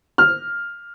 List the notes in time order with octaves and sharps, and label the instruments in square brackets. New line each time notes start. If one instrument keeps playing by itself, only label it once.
[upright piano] F6